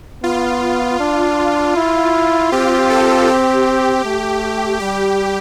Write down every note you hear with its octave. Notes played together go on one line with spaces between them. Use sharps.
B3 F4
D4
E4
C4 G4
A4
G4
A3
G3 G4